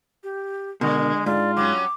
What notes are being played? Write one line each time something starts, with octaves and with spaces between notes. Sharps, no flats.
G4
B2 D3 G#3 A#4
G#2 F4 D5
F#3 G3 C#4 D6